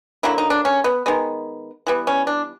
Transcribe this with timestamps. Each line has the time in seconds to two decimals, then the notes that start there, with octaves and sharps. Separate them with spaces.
0.23 D3 F#3 A#3 E4
0.38 D#4
0.50 D4
0.65 C#4
0.84 B3
1.06 D#3 G#3 B3
1.87 E3 G3 B3
2.07 C#4
2.27 D4